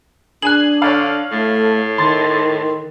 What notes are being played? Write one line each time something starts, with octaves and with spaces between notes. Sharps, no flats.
D4 G#4 G#5 F#6 F#7
D3 C#5 F5
A2 A3
D#3 C6 A6